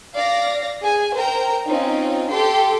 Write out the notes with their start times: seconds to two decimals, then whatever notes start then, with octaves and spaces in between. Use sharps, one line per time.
0.15 D5 F5 A#6
0.82 G#4 G#5
1.15 A#4 C5 G5 A#5
1.65 C4 C#4 D#4 F4
2.31 G4 A4 G5 C6